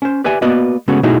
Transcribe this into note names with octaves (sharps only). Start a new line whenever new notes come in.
C#4 C5
G4 B4 D5 E5 G#5
A#3 B3 F#4 B4 D5 D#5
C#3 G#3 A3 B3 C#4 F#4
B2 A3 D#4 E4 F#4 G#4